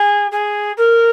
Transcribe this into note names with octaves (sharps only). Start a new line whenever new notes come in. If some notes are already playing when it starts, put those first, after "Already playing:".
Already playing: G#4
G#4
A#4